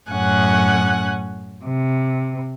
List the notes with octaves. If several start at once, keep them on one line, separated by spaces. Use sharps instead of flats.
F#2 A2 C#4 F#5 G#5 F#6
C3